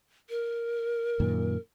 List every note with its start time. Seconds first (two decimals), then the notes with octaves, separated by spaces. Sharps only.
0.30 A#4
1.20 F#2 A#2 D#3